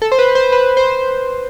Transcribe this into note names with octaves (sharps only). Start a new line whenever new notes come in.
A4
C5
B4
C5
B4
C5